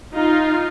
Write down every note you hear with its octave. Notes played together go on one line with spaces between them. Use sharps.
D#4 F4